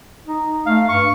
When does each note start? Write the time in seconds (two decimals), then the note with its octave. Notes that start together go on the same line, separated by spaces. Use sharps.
0.27 D#4
0.66 A3 F5
0.89 G2 C#6